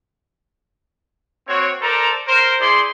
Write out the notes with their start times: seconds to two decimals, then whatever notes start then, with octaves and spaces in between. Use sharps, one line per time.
1.48 A#3 C4 F#4 C#5
1.82 A4 A#4 C5 D5 A#5
2.28 A#4 C5
2.61 E4 G#4 D5 C6